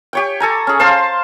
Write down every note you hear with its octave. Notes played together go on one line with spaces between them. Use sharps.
G4 C#5 G5
A4 G#5 A#5
C#4 G#4
C5 F5 A5 C6